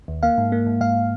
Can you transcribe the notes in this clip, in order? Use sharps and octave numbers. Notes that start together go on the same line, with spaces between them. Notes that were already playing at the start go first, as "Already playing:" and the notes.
D#2
A#3 F5
G#2
A#3
G#2
G#2 F5